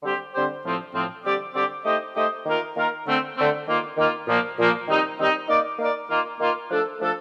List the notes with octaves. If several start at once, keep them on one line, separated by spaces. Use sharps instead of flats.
D3 G3 C4 G4 C5
D3 G3 C4 G4 C5
A2 F3 C4
A2 F3 C4
D3 G3 C4 G4 D5
D3 G3 C4 G4 D5
A3 D#4 G4 C5 D#5
A3 D#4 G4 C5 D#5
D#3 A#3 F4 A#4
D#3 A#3 F4 A#4
D3 A3 C4
D3 A3 C4
D#3 A#3 F4
D#3 A#3 F4
A#2 F3 A#3
A#2 F3 A#3
D#3 G3 C4 D#4
D#3 G3 C4 D#4
A#3 D#4 A#4 D5
A#3 D#4 A#4 D5
D#3 A#3 F4
D#3 A#3 F4
F3 A3 D4 A4
F3 A3 D4 A4